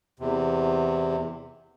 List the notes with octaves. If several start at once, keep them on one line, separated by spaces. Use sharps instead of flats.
E2 C3